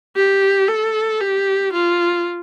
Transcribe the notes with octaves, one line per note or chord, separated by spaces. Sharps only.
G4
A4
G4
F4